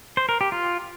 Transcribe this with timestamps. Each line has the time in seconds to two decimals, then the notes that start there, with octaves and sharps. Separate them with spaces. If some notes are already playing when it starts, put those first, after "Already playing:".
0.17 C5
0.29 A#4
0.41 G4
0.52 F4